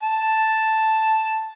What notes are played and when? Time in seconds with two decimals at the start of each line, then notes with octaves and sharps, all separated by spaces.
0.03 A5